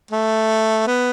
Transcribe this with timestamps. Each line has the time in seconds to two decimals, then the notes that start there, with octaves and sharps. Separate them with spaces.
0.11 A3
0.87 B3